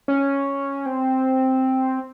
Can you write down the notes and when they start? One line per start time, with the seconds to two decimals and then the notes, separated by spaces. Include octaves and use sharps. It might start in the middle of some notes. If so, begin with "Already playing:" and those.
0.08 C#4
0.86 C4